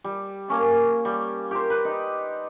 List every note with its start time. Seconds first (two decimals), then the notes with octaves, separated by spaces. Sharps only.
0.04 G3
0.48 A#3 C#4 A5
1.05 G3
1.51 G4 A#4 C5
1.70 B4
1.85 D#4